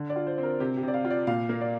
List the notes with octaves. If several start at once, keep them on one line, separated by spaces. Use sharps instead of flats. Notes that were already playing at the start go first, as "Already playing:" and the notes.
Already playing: D3
D5
F4
C5
C4
A#4
C3 G4
G4
C3 D5
F5
F4
D5
A#2 F5
A#3
D5